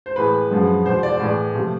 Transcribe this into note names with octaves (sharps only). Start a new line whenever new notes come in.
C5
A2 E3 G#3 B4
F#2 D3 F3 G#3
E2 B2 G#3 C5
D5
A2 E3 G#3 D5
C3 F3 A3